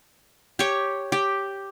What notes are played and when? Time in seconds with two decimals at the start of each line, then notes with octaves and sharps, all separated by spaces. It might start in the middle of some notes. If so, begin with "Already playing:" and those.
0.59 G4 C#5
1.12 G4